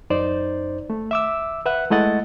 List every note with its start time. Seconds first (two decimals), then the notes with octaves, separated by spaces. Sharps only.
0.10 F#2 D#4 C5 D5
0.90 A3
1.11 E5 D6 E6
1.66 B4 E5 F#5 F#6
1.90 G#3 A3 E4 D#5 F#5 A6